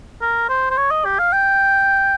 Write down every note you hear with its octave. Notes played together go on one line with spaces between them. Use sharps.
A#4
C5
C5
C#5
D#5
G4
F5
G5